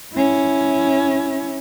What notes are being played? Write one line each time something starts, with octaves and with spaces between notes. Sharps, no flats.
C#4 E4